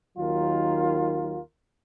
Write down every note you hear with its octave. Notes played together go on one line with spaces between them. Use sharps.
D#2 D#3 F#3 D#4 F4 A#4